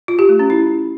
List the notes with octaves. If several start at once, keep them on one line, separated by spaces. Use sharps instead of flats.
F4
G4
A3
C#4
E4